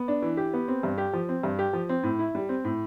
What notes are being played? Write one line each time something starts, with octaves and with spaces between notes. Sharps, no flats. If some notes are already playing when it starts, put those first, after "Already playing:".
Already playing: B3
D4
E3
G4
B3
C4
G2
G4
F3
C4
G2
G4
F3
C4
A2
E4
G3
C4
A2